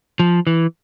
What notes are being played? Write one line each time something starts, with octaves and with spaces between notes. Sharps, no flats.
F3
E3